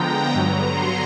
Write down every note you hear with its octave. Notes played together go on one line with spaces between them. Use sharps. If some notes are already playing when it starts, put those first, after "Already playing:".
Already playing: D3 F3 G#3 B3 G5 A#5
G2 D3 F#3 B3 A#5
C6